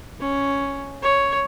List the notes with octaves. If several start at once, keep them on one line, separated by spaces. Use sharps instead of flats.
C#4
C#5